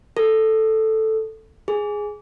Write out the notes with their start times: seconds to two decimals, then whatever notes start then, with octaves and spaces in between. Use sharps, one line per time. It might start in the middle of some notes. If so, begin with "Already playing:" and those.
0.17 A4
1.68 G#4